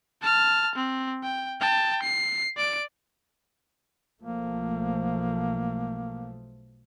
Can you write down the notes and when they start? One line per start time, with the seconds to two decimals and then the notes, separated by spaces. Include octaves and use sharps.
0.22 A5 F6
0.75 C4
1.23 G5
1.60 G5 A5
2.02 C7
2.57 D5 D7
4.22 B1 F3 A3 A#3